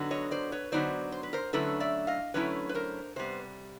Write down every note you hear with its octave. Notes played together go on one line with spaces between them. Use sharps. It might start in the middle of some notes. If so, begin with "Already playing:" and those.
Already playing: D3 F#3 B3 D#4
C#5 D#5
C5 D5
B4 C#5
D3 F#3 B3 D#4 C5 D5
C5
B4
A#4 C5
D3 F#3 A3 C#4 E4 A4 B4
D5 E5
D#5 F5
D3 F#3 A3 C#4 E4 B4 C#5
B4
A#4 C5
C3 G3 B3 C5